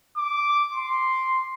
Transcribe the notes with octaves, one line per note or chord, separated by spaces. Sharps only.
D6
C6